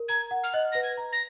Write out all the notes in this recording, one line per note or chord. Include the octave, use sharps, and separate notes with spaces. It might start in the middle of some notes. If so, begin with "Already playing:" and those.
Already playing: A#4
A#5 G#6
F#5
F6
D#5 F#6
B4 A#6
G#6
A#5
A#6